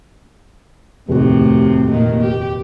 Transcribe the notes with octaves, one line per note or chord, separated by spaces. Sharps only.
F1 D#2 A2 C3 F#4
A#2 D#3 A#3
G4